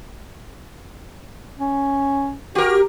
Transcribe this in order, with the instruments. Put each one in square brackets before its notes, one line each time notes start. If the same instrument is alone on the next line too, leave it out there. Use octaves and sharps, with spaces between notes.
[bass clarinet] C#4
[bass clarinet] F#4 [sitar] G4 A#4